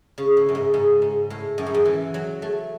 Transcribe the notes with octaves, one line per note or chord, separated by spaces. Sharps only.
C#3
A2
F#2
G#2
G#2
G#2
A2
F#2
G#2
F#2
E3
F#3
A3